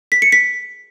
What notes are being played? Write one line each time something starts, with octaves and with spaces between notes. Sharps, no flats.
B6
C#7
B6